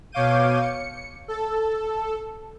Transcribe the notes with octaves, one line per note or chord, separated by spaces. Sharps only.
B2 C#5 F5 D6 G6 D#7
C#7
A4